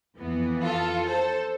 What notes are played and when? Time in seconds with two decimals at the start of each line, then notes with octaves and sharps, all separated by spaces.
0.18 F2 E3 B3
0.63 F4 A4
1.08 A4 C5